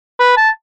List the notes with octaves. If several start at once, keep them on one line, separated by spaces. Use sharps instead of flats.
B4
A5